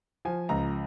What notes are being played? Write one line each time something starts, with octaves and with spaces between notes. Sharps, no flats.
F3 G#5
C#2 A#5